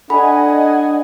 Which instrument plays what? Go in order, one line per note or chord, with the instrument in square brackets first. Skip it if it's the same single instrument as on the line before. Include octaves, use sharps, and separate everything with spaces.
[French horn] D4 [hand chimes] A4 B5 [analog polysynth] D#5 G#5 [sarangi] F#5